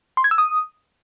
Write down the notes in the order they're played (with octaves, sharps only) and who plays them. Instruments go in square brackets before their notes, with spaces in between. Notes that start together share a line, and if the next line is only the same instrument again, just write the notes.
[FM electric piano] C6
G#6
E6
D#6